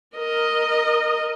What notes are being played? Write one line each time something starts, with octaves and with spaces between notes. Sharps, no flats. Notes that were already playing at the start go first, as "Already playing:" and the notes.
A#4 D#5